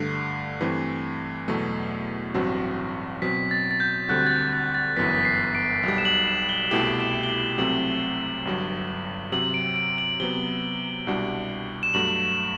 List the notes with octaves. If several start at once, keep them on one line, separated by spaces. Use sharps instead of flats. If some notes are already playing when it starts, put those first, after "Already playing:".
Already playing: G2 D3 A3 C7
G2 E3 A3 C4
E2 B2 F#3 A3
A1 G2 F#3 C4 F#4
B2 F#3 C4 B6
A6
A6
G6
D2 D3 G3 C4 F#4 F#6
A6
G6
A6
A6
G1 F#2 E3 B3 B6
B6
C7
D7
B1 B2 G3
E7
F#7
E7
F#7
G7
C2 B2 A3 E4 G4 F#7
E7
G7
F#7
C2 C3 F#3 A3 C4 F#7
G1 G2 F#3
C3 F#3 C4 F#7
D7
D7
F#7
C3 F#3 B3 G7
C2 B2 G3 D4 F#4
E7
G2 F#3 A3 F#7